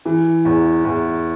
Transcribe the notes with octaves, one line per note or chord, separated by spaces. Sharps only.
E3
E2
E2